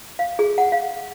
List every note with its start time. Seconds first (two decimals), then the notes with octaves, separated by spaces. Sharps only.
0.19 F5
0.39 G#4
0.58 F#5
0.72 F5